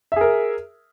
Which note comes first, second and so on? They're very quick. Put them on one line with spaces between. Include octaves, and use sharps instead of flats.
E5 G#4 A#4